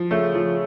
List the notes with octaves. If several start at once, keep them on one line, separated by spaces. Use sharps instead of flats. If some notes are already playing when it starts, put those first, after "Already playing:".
Already playing: F3
C#3 A3
F3